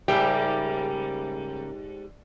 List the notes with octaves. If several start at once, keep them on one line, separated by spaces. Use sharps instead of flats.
G#2 C#3 G3 A#3 G4 E5